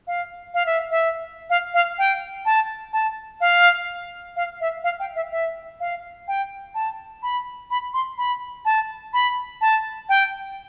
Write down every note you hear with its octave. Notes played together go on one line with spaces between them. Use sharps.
F5
F5
E5
E5
F5
F5
G5
A5
A5
F5
F5
E5
F5
G5
E5
E5
F5
G5
A5
B5
B5
C6
B5
A5
B5
A5
G5